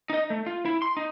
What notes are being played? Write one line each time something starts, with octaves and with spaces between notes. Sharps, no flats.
D#4 D#5
A3
F4
E4
C6
D#4